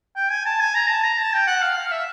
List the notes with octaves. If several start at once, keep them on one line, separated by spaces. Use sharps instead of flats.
G5
G#5
A5
G#5
A#5
A5
A#5
A5
G5
F#5
F5
F5
E5